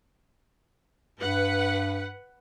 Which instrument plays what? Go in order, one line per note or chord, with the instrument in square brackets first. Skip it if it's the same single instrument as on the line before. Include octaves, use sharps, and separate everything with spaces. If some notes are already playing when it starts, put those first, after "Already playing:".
[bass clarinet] G2 [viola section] B4 F#5